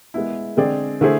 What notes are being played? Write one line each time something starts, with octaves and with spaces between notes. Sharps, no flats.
G#3 B3 E4
D3 G#3 C4 G#4 D5
D3 A3 E4 G#4 C5